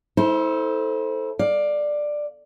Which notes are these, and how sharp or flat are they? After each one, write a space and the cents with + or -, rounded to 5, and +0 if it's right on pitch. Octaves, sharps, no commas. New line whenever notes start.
E4 -40 A4 +0 C5 +0
D5 +10 F5 +20